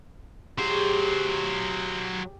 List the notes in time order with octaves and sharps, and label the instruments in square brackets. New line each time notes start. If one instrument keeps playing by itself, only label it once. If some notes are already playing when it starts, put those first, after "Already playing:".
[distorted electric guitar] F#3 C5 [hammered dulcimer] G4 G#4